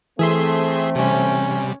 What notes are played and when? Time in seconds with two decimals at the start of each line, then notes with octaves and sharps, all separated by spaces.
0.19 E3 A3 C4 G#4 E5 C6
0.95 C3 G3 C#4